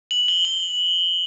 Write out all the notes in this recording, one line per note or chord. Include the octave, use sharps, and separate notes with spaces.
F#7
G7
F#7